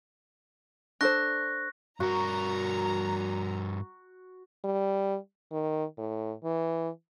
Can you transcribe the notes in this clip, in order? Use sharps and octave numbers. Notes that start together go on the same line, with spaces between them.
D4 A4 C5 C#6 F#6 A#6
G2 F#4 A#4 A#5
G3
D#3
A2
E3